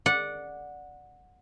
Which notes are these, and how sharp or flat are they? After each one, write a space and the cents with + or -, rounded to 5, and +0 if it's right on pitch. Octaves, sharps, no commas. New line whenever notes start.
D5 +0 F#5 -15